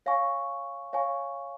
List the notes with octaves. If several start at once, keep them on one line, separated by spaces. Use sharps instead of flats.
C#5 F5 G#5 C#6
C#5 F5 G#5 C#6